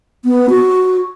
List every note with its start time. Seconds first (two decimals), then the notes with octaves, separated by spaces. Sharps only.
0.25 B3
0.50 F#4